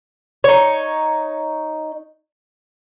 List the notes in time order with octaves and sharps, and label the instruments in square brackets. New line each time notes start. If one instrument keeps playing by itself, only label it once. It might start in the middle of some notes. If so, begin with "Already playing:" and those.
[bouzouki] D#4 C#5